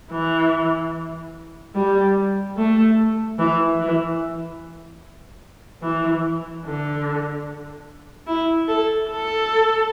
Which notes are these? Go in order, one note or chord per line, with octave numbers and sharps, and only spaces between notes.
E3
G3
A3
E3
E3
E3
D3
E4
A4
A4